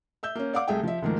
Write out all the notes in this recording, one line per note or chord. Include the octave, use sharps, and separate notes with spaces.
E5 E6 G6
A#3 C#4
D5 F5 F#5 D6
C2 A3 G#4 E5 G5
F3 E5
D2 G#2 D#3 F3 A#3